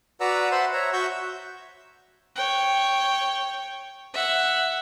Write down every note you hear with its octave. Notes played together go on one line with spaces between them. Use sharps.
F#4 B4 D5 F#5 A#5 E6
C5 E5 F#5 A5 B5 C6
C#5 E5 A#5
F#4 E5 F#5 C#6 E6 G6
C#5 G5
E5 F#5